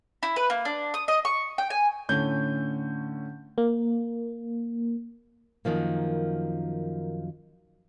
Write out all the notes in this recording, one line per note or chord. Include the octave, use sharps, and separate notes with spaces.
E4
B4
A#3
D4
D#6
D#5
C#6
G5
G#5
A2 D3 C#4 G6
A#3
F#2 D#3 F3 A#3